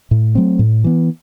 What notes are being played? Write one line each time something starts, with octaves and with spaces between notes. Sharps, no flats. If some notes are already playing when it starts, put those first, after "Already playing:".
A2
F#3 A3 C4
A2
E3 B3